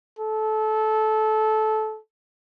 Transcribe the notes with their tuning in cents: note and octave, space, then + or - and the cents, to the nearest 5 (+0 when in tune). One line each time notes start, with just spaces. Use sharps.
A4 -20